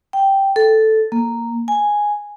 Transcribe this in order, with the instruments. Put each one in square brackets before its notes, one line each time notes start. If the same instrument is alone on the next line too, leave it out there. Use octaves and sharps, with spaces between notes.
[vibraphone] G5
A4
A#3
G#5